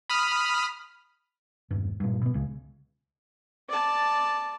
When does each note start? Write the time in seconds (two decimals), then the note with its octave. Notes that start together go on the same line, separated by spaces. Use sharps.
0.10 B5 D#6 F6
1.71 E1 G2
2.00 G2 A#2
2.22 B2 B3
2.34 C#2 C#3
3.69 D5 A5